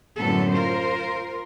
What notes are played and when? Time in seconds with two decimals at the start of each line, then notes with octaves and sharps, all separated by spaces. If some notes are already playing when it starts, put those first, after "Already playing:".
0.18 F#2 A2 D3 F#3 B3 A4
0.52 F4 A#4 C5